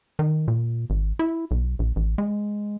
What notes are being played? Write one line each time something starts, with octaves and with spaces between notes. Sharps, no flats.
D#3
A#2
G#1
E4
B1
A#1
A1
G#3